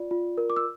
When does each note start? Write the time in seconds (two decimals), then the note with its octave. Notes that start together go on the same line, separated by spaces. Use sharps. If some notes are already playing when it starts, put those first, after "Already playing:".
Already playing: F4 D5
0.11 F4
0.38 A#4
0.50 D6
0.56 E6